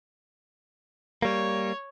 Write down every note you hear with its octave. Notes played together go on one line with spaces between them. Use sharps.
G3 A#3 C#5